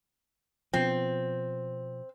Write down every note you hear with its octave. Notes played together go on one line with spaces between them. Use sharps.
B2 F3 C4